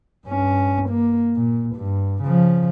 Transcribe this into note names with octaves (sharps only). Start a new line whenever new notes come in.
G2 C#4
A#3
A#2
G2
C#3 F3